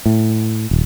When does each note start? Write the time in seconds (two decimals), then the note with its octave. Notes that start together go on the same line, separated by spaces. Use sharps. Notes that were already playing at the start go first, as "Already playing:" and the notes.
0.06 A2
0.71 D#1